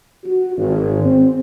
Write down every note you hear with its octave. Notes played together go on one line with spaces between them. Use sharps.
F#4
G#1
C4